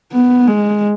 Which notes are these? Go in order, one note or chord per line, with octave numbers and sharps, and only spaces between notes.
B3
G#3